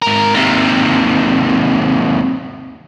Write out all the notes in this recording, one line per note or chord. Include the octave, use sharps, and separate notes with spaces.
G#2 A#4
D#2 C3